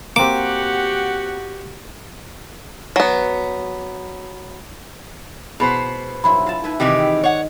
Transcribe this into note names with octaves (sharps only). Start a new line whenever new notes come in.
A#3 C4 F#4 G4 F#5 D6
F#3 B3
B2 E4 G#4 B4 C5 B5
G2 F#3 E4 B5 C6
E4 F4 F5 A5
D#4 E4 B4
C3 D#3 E3 G#3 G4
C#5 F#5